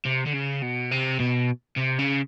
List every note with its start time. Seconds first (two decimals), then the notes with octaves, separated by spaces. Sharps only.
0.06 C3
0.27 D3
0.34 C#3
0.62 B2
0.91 C3
1.20 B2
1.76 C3
1.99 C#3